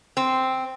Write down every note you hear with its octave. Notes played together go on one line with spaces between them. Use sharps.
C4